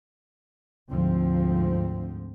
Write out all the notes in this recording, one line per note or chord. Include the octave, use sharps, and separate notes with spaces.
D2 G#2 D3 F3 C4